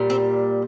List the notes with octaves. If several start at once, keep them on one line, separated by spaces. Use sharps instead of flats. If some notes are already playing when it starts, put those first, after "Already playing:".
Already playing: A#2 G3
C4